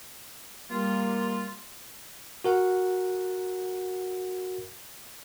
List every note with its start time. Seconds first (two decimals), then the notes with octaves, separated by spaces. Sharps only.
0.71 G3 A#3 F4 C6
2.44 F#4 A#4 F#5